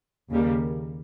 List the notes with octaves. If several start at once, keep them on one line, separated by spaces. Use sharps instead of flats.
D#2 C#3 G3 A#3